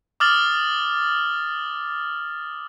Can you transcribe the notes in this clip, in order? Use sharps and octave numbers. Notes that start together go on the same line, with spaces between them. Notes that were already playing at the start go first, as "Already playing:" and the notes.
D6 D#6 F6 A6 F#7